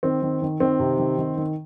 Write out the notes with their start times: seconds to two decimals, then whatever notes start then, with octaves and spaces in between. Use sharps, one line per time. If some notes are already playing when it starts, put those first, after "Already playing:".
0.03 D#3 C4
0.22 D#3
0.42 D#3
0.60 D#3 C4
0.79 C3
0.99 D#3
1.18 D#3
1.37 D#3